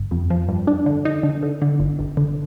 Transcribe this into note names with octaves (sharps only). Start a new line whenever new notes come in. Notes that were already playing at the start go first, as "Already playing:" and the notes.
Already playing: G1
F2
F3
G2
D4
D3
D#4
D3
D3
D3
G1
G1
D3